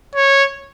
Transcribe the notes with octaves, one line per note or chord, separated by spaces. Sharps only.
C#5